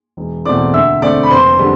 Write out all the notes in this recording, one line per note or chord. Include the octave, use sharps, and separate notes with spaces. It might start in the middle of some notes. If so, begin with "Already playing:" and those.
E1
E2 B2 A3 C4 D5 D6
D2 E5 E6
D3 A3 C4 D5 D6
B5
F1 C5 C6
D3 G3